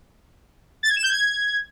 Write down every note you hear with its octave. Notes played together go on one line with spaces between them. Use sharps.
A6
G#6
E7
G6
G#6